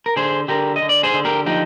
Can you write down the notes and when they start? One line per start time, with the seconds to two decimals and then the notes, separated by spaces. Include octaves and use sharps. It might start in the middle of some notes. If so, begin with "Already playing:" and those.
0.06 A#4
0.16 D3 G#4 C5
0.48 D3 G4 A#4
0.76 D#5
0.82 D3
0.89 D5
1.03 G#4 C5
1.13 D3
1.25 G4 A#4
1.46 F3 D#4 G4